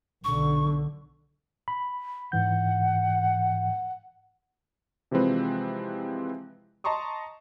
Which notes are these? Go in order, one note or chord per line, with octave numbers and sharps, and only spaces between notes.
B1 D3 C#6
B5
G#2 E3 F#5 G6
C3 E3 F3 G#3 C4 B4
D#5 A5 A#5 C6 C#6 D#6